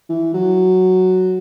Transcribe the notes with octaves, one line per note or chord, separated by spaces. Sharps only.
E3
F#3